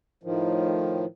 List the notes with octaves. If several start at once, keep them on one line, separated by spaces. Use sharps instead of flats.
A2 D#3 F3